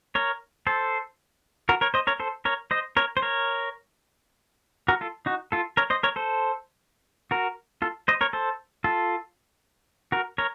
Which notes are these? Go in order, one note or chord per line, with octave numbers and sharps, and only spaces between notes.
A#4 C#5
A4 C5
F#4 A#4
A#4 C#5
C5 D#5
A#4 C#5
A4 C5
A#4 C#5
C5 D#5
A#4 C#5
C5
A#4 C#5
F#4 A#4
F4 A4
D#4 F#4
F4 A4
A#4 C#5
C5 D#5
A#4 C#5
A4 C5
F#4 A#4
F4 A4
C5 D#5
A#4 C#5
A4 C5
F4 A4
F#4 A#4
A#4 C#5